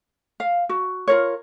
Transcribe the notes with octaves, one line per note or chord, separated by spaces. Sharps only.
F5
F#4
F4 A#4 C#5